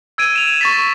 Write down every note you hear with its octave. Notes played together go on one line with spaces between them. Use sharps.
E6 G#6 D7 D#7
E7 F7
C#6 A6 B6